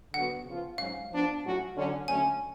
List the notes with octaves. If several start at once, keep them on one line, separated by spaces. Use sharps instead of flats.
D3 F#3 B3 F#4 F#5
C#3 F3 B3 F4
G#2 F#3 C#4 F5
F3 B3 D4
A2 F#3 C#4 F#4
D3 F#3 C#4
D2 D3 F#3 A3 C#4 G#5